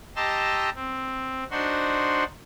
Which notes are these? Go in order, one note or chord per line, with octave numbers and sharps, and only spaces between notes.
G4 D#5 A5 A#5 C6 E6
C4
D4 D#4 F#4 C5 F#5 C6